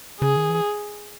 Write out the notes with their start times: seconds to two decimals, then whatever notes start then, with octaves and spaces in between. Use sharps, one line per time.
0.21 C#3 G#4
0.36 D#3
0.50 E3